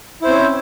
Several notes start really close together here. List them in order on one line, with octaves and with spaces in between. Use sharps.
E4 C5 C4 C#4